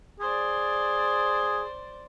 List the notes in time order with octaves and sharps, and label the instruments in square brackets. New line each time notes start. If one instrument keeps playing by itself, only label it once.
[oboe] G#4 [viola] C5 D5